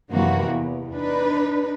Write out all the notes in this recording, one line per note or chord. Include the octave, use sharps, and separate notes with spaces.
F#2 C3 D#3 E3 A#3 F#4
E2
D4 D#4 B4